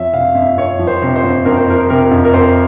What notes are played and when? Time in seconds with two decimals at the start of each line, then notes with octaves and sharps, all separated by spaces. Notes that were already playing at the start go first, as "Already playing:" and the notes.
Already playing: F2 F3 C#5 E5
0.13 C3 F5
0.35 F2 E5
0.57 F2 C#5
0.79 F3
0.87 C5
1.02 C3
1.16 C5
1.23 F2
1.45 F2 A#4
1.57 C5
1.68 F3 A#4
1.90 C3 A#4
2.11 F2
2.25 A#4
2.34 F2 C5